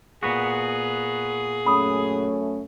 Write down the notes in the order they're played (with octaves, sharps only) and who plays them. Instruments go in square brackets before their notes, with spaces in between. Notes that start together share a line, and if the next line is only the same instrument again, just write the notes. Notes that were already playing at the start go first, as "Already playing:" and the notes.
[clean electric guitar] A#2 B3 F#4 [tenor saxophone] G#4
[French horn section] F#2 A3 C#4 [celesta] B5 D#6